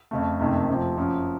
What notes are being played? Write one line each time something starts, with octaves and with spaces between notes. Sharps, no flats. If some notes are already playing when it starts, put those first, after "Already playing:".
F2 C#3 A3
F#1 F2 C3 D#3 A3
F1 F2 C3 F3
F#1 F#2 F3